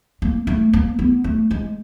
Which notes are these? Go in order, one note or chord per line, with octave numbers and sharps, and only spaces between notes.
A#3
A3
A#3
B3
A3
G#3